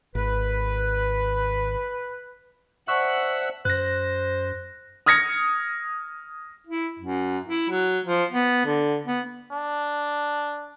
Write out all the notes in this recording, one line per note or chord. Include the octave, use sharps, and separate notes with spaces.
G#1 B4
C5 D5 E5 F#5 A5 C#6 E6 F#6
F#2 C5 F#6 A#6
D#6 F6 G#6 A#6 C#7
E4
F#2
E4
F#3
F3
B3
D3
B3
D4